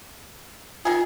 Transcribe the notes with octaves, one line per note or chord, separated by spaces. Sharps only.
D#3 F4 G#4